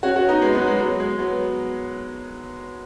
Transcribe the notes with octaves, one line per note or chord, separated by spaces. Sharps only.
C#4 F#4
C#4 F#4
B3 D#4
G#3
F#3 B3
G#3
F#3
G#3
F#3 B3